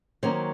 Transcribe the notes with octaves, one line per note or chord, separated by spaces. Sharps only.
D#3 F#3 A#3 C#4 C5